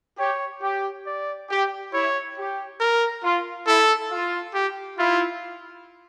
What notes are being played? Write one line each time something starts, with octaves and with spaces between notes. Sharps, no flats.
G4 C#5
G4
D5
G4
E4 C#5
G4
A#4
F4
E4 A4
F4
G4
E4 F4